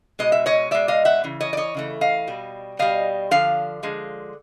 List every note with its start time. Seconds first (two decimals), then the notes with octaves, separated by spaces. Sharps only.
0.19 B2 G#3 D#5
0.32 E5
0.46 C#5 D#5
0.71 B2 G#3 D5 E5
0.88 D#5 F5
1.05 E5 F#5
1.24 C#3 E3
1.41 C#5 D#5
1.53 D5
1.57 C#5 D#5
1.74 C#3 E3 A3
2.01 D#5 F5
2.27 B2 G3
2.79 B2 G3 D#5 F5
3.31 D3 F3 F5
3.83 D3 F3 G#3